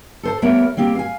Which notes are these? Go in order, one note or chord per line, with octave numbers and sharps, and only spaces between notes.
A4 C5 A5
G3 A3 B3 A#4 C#5
G3 A#3 C4 G4
F5 G#5